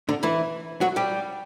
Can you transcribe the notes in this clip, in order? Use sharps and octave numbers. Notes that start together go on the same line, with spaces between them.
D3 D4
E3 E4
F#3 F#4
G3 G4